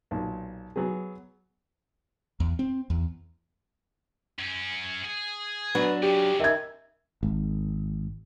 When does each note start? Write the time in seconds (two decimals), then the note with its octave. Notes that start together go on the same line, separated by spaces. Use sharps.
0.11 B1 A#2
0.76 F#3 B3 G#4
2.40 E2
2.59 C4
2.90 E2
4.39 F#2 C#4
5.05 G#4
5.75 F#3 B3 D4
6.03 F2 C#3 G4
6.40 D#3 E5 G#6
7.23 G#1